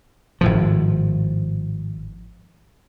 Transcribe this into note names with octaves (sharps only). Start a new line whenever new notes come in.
G#1 A2 F3